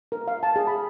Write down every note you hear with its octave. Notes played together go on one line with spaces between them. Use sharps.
A#4
F5
A5
G#4
B5